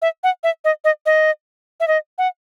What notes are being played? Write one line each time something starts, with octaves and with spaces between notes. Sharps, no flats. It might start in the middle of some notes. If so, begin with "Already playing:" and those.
E5
F#5
E5
D#5
D#5
D#5
E5
D#5
F#5